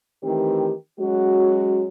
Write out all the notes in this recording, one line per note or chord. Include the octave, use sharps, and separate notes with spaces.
D#3 E3 A3 C4 G4
F#3 G#3 C#4 F#4